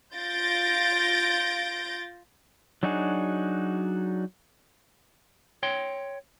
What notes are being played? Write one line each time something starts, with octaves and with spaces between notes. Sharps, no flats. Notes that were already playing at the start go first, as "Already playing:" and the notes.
F4 G6 A6 A#6 D7
F#3 D4 D#4 F#4 G#4
C#5 G5 C6